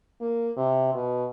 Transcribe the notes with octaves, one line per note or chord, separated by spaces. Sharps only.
A#3
C3
B2